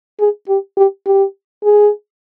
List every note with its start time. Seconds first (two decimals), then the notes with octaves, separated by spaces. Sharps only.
0.20 G#4
0.49 G4
0.77 G4
1.06 G4
1.64 G#4